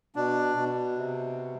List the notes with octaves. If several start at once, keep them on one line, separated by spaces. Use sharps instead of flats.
B2 D4
B2
C3